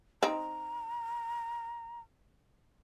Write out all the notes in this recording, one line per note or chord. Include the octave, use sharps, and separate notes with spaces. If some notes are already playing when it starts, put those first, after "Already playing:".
C4 D#4 A#5